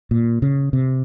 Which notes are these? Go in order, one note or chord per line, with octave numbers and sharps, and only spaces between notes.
A#2
C#3
C3